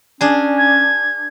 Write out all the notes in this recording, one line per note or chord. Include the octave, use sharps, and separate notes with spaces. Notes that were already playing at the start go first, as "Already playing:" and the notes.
C#4 D4 G#4
G#6